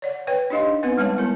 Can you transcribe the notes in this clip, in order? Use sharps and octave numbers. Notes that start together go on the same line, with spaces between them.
C#5 D5 F#5
B4 C#5 G5
D4 D#4 G4 D#5 F5 C6
B3 C4 D#4 B4 F#5
G3 G#3 B4 C#5 F#5 A5
B3 E4 A#4